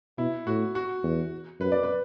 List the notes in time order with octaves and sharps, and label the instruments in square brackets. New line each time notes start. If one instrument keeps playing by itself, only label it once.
[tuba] B2 [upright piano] E4
[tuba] A2 [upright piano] F#4
[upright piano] F#4
[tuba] E2
[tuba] F#2 [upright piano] B4
[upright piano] D5
B4